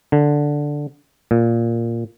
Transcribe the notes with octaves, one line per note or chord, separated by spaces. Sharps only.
D3
A#2